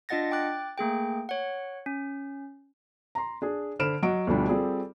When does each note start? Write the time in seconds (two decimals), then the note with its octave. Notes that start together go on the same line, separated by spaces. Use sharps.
0.09 D4 F4 D#5 F#5 A6 A#6
0.31 G5 D6 F#6 A6
0.78 A3 A#3 G#4 G5
1.29 C#5 F#5
1.86 C#4
3.15 A#5 C6
3.42 D4 G#4
3.79 D3 C5 B5 F6 D7 E7
4.02 F#3 D#5 F#5 C#6 D7
4.27 D2 B2 D3 F3 G3 D4
4.48 G3 C4 F4 G#4 A4 D5